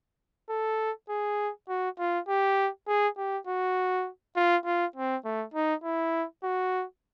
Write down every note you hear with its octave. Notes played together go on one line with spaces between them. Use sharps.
A4
G#4
F#4
F4
G4
G#4
G4
F#4
F4
F4
C4
A3
D#4
E4
F#4